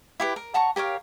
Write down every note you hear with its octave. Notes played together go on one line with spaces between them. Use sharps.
E4 G4 B4
A#4
F#5 A5 A#5 C#6
G4 A#4 C#5 F5